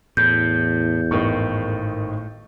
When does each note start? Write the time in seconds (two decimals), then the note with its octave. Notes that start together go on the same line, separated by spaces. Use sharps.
0.17 E2 A2 G6
1.11 G#1 A2 D#3 C#6